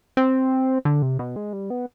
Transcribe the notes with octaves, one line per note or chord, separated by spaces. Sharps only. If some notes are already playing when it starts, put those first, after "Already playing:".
C4
D3
C3
B2
G#3
G3
B3